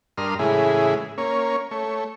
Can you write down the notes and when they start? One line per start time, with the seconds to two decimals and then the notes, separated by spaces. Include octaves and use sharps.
0.18 G2 D4 A#4 C6 D#6 F6
0.39 A2 C#3 E3 G#3 E4 G#4
1.18 A#3 C#4 C#5
1.71 A3 C#5